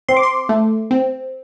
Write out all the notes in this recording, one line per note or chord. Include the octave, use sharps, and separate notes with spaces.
C4 C6
D6
C6
A3
C4